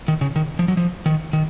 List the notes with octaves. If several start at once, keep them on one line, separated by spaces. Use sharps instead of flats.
D#3
C#3
D#3
F3
F#3
F3
D#3
D#3